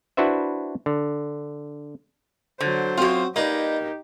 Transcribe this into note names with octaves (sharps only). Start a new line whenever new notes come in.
D4 E4 F#4 B4 C5 E5
D3
D3 F#3 C5
F#2 C4 F4 F#4
A#3 D#4 G4 B4 D5 D#5